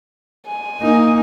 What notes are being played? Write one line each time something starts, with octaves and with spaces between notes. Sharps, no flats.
G#5
A#3 D#4